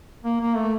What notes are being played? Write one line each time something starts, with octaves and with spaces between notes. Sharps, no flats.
A#3
A#3
A3